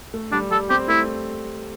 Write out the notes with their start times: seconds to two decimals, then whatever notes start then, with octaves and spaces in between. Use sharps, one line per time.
0.14 A3
0.32 G3 D4
0.51 G3 A4
0.70 C4 G4
0.89 A3 E4